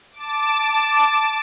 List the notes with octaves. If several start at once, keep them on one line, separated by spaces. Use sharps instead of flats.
A5 D6